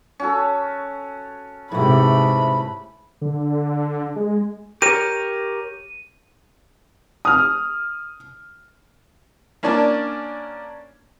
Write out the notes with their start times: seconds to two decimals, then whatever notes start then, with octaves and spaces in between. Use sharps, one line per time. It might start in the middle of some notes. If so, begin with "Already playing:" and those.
0.20 C#4 F#4 A4
1.72 G#2 C3 E3 A3 B5
3.21 D3
4.16 G#3
4.82 G4 A#4 C#5 D#7
7.25 D#6 F6
9.63 A#3 C#4 D4 D5 A5